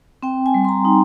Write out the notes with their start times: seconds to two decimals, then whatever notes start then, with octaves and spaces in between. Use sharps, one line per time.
0.23 C4 G5
0.46 G#5
0.54 G3
0.65 C6
0.69 A#5
0.85 D#4